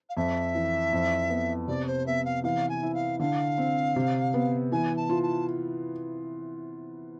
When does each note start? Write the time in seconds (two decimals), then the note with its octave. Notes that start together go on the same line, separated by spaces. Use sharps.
0.09 F5
0.16 F2 E5
0.55 E3
0.93 F2
1.30 B3
1.68 C3 D5
1.87 C5
2.06 B3 E5
2.25 F5
2.44 E3 F5
2.69 G#5
2.83 E4
2.94 F5
3.19 D3 F5
3.58 C4
3.96 C3
4.34 B3
4.72 E3 G#5
4.97 A5
5.09 F4
5.23 A5